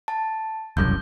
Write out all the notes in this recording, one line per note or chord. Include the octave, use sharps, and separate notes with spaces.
A5
E1 C2 F#2 G6